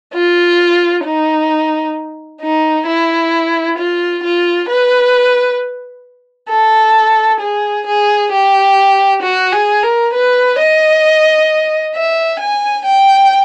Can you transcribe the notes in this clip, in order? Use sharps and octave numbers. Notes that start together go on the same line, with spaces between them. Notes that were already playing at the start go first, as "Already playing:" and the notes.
F4
D#4
D#4
E4
F4
F4
B4
A4
G#4
G#4
G4
F#4
G#4
A#4
B4
D#5
E5
G#5
G5